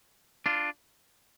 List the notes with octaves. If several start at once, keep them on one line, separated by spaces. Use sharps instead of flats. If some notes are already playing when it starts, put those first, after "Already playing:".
D4 F4